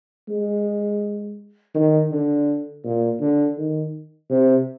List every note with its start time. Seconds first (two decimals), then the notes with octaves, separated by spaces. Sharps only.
0.29 G#3
1.75 D#3
2.11 D3
2.84 A#2
3.20 D3
3.57 D#3
4.30 C3